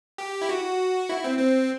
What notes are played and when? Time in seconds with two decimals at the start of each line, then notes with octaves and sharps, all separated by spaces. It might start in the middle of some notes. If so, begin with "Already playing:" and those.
0.18 G4
0.42 E4
0.49 F#4
1.09 E4
1.24 C4
1.39 C4